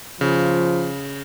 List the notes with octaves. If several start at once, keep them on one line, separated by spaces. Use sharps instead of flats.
C#3 F3